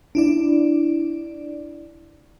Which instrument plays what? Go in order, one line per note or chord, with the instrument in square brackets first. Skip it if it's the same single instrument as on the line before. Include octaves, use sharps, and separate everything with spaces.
[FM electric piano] D4 E4 D5